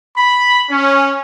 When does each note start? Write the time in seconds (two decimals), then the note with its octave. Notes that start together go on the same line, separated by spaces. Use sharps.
0.17 B5
0.70 C#4